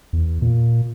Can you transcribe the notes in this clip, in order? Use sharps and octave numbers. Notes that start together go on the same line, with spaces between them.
E2
A#2